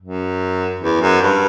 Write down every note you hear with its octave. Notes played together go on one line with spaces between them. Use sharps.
F#2
E2
F#2
G2